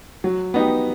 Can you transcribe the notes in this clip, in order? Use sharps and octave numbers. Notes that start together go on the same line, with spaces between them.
F#3
B3 D#4 G4